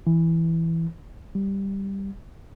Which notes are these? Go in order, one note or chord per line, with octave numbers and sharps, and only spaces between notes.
E3
G3